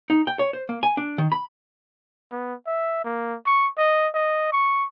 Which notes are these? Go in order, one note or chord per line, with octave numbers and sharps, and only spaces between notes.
D#4
G5
C#5
C5
A#3
G#5
D4
D#3
B5
B3
E5
A#3
C#6
D#5
D#5
C#6